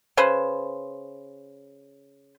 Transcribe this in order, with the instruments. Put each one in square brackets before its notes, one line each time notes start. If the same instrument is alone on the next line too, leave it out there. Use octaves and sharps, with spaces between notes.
[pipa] C#3 B4 C5